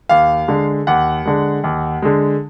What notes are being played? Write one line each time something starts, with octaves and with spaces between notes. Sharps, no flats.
D#2 F5
D3 G#3
D#2 F#5
D3 G#3
D#2
D3 G#3